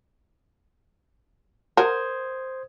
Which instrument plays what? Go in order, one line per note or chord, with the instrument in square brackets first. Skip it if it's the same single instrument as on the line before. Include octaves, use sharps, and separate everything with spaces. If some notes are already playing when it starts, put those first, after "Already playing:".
[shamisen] F#4 A#4 [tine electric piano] C5 D#6 G#6